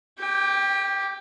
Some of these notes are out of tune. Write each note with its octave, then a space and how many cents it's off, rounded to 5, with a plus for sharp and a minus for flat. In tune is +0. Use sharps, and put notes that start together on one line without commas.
G4 -5 G5 +25